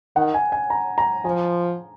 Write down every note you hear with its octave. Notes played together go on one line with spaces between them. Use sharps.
D#3 F#5
G#5
G#5
A#5
A#5
F3 G#5